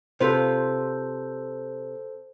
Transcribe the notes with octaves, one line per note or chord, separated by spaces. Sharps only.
C3 F4 A4 B4 C5